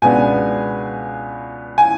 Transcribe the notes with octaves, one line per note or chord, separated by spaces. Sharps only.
C#2 B2 G#3 B3 D4 G#5
G#5